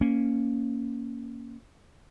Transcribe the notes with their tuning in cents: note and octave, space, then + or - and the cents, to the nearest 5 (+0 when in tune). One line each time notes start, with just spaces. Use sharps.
A#3 +0 C#4 +0